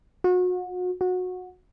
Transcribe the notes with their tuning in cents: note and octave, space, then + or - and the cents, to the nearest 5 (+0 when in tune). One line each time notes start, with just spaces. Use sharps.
F#4 -35
F#4 -20